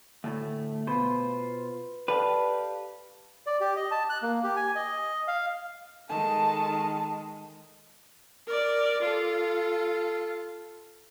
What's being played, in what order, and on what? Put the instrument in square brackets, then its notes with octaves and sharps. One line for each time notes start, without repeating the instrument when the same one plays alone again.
[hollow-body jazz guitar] D2 A2 [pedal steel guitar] A3
[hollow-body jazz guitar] B2 [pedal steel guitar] F4 C5 [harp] B4
[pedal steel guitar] G4 F5 [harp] A4 D5 A5 [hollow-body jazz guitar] B4
[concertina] D5
G4
D#5
A5
F#6
A#3
G4
G#5
D#5
F5
[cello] D#3 G#3 [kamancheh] A4 A5
[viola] A#4 D5
F4 A4